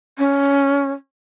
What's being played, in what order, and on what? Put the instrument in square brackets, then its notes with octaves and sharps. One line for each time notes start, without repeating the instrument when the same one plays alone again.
[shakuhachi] C#4